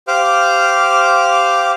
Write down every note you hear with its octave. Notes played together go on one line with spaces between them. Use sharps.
G4 C5 F5 D6 F6